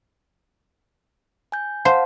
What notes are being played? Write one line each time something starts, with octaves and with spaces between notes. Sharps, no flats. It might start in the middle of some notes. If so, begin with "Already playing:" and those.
G#5 G6
C5 F5 F#5 A5